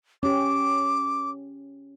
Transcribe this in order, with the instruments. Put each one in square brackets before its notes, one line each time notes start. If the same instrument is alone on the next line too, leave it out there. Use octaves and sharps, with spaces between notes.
[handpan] C#4 G4 [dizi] D6